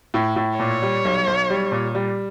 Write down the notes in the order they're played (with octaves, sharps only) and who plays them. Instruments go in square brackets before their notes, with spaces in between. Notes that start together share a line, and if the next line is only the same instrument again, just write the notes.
[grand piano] A2
A2
[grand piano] A#2 [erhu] C#5
[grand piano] G3
B1
B1
G3
A#2
G3